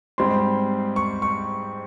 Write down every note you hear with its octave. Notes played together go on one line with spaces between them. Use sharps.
G#2 G3 C4 C6
C#6
C#6